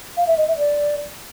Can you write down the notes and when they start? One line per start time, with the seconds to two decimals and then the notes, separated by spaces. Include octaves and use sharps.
0.17 F5
0.27 E5
0.38 D#5
0.48 E5
0.58 D5